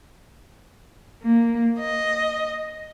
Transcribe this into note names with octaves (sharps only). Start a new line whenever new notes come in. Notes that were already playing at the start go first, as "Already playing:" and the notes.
A#3
D#5